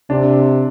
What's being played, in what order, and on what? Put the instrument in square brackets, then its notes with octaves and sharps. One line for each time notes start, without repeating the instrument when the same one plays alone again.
[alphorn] C3 [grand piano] D4